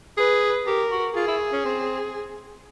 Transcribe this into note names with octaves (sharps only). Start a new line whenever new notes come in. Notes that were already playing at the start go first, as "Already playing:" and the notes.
G#4 B4
G4 A#4
F#4
F4 G#4
E4
C#4
C4